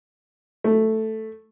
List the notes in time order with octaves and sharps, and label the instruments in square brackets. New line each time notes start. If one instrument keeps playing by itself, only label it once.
[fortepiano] A3